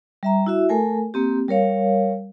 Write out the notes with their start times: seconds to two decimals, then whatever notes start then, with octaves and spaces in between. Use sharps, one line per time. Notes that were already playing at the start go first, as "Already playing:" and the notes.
0.23 G3 E5 A#5
0.46 E4 F#4 E5
0.69 A3 A4 A#4 G#5
1.14 A#3 C4 G4
1.48 G3 A#4 C#5 F5